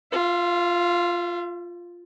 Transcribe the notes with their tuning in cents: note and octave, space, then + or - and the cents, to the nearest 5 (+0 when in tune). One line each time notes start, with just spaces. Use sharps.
F4 +0 E5 +45